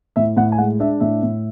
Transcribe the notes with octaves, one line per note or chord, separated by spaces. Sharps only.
A2 E5
A2 F#5
G#5
G#3 F#5
D4 E5
A2 E5
A2